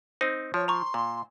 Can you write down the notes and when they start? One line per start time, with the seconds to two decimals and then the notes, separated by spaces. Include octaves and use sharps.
0.21 C4 D#4 C5
0.54 F3 C#5
0.68 A#5 C6 C#6
0.94 A#2